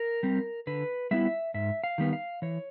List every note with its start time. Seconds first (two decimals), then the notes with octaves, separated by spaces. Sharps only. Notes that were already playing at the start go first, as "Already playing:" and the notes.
Already playing: A#4
0.23 G3 C4
0.67 D3 B4
1.11 G3 B3 E4 E5
1.54 G#2 E5
1.84 F5
1.98 D#3 G3 B3
2.13 F5
2.42 E3 C#5